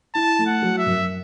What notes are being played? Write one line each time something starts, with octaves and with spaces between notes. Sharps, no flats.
E4 A5
A3
F#5
F#3
E5
F#2